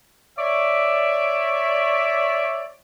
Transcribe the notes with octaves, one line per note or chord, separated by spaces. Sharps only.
C#5 D5 E5